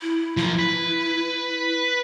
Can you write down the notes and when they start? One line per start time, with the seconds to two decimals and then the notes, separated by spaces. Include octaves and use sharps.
0.02 E4
0.37 F3 E4 A#4
0.58 B4